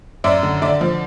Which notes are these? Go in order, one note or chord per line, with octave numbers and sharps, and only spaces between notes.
F#2 D5 E5
D3
D3 D5 E5
F3